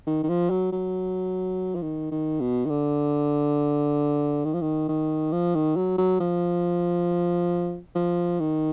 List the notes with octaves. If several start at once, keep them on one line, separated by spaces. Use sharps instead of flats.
D#3
D#3
F3
F#3
F#3
F3
D#3
D#3
B2
D#3
D3
D#3
F3
D#3
D#3
F3
D#3
F#3
F#3
F3
F3
D#3